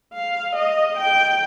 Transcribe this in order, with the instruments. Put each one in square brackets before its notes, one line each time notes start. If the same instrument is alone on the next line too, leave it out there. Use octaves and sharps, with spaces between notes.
[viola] F5
D#5
G5